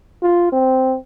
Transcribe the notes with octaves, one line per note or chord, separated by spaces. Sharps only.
F4
C4